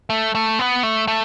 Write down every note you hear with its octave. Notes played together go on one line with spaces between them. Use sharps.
A3
A3
B3
A3
A3